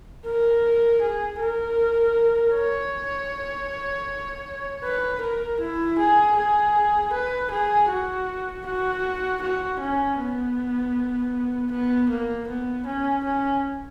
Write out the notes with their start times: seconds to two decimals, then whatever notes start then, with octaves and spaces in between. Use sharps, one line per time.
0.25 A#4
1.01 G#4
1.39 A#4
2.54 C#5
4.84 B4
5.21 A#4
5.60 E4
5.98 G#4
6.36 G#4
7.13 B4
7.51 G#4
7.89 F#4
8.66 F#4
9.42 F#4
9.79 C#4
10.18 B3
11.71 B3
12.09 A#3
12.48 B3
12.86 C#4
13.24 C#4